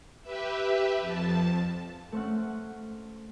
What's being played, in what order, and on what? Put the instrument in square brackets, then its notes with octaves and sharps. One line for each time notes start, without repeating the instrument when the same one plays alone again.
[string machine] G4 B4 E5
F2 A5
[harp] A3 C4 C#4 F#5